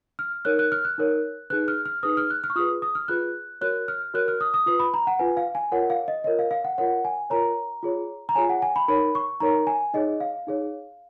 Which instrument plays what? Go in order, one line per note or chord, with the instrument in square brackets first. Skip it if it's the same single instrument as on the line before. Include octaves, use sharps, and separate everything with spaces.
[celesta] F6
D#4 A#4 C#5 F#6
F#6
F6
F#6
D#4 A#4 C#5
D#4 G#4 B4 F#6
F6
F6
D#4 G#4 B4 D#6
F6
F#6
F6
C#6
F4 G#4 B4 D#6
D#6
F6
F4 G#4 B4 F#6
F#4 A#4 C#5 F#6
F6
F#4 A#4 C#5 F#6
F6
D#6
D#6
F4 B4 D#6
B5
A#5
F#5
F4 B4 G#5
F5
G#5
F4 A#4 C#5 F#5
F5
D#5
F4 A#4 C#5 D#5
F5
F5
F#5
F4 A#4 C#5 F#5
G#5
F4 A#4 C#5 A#5
F4 G#4 C#5
A#5
F4 G#4 C#5 G#5
F#5
G#5
B5
D#4 A#4 C#5 B5
C#6
D#4 A#4 C#5 A#5
G#5
D#4 G#4 C#5 D#5
F5
D#4 G#4 C#5